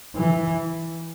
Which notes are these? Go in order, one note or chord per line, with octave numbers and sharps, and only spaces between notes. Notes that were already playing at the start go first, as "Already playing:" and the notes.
E3